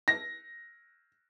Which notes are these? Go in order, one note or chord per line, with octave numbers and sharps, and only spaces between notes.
A#6